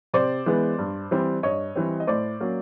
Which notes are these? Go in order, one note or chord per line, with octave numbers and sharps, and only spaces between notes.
C3 C5 D5
E3 G#3 B3
G2
E3 G3 C4
G2 C#5 D#5
E3 G3 C4
D#5
A2 C5 D5
F#3 A#3 C#4